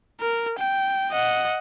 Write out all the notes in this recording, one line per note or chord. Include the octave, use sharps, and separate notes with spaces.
A#4
G5
D#5 F#5